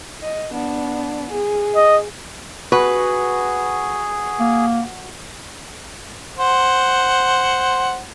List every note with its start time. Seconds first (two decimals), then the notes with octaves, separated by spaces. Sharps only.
0.22 D#5
0.52 B3 D4
1.31 G#4
1.76 D#5
2.72 F#4 G#4 B4
4.40 A#3
6.38 C5 F#5